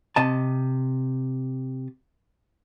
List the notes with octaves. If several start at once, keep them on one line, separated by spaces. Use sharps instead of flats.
C3 D#5 A5